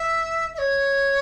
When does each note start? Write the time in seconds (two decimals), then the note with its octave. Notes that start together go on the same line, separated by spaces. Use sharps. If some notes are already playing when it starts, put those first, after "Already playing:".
Already playing: E5
0.54 E5
0.58 C#5